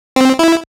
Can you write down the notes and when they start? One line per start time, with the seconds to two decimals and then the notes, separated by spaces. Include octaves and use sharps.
0.16 C4
0.39 E4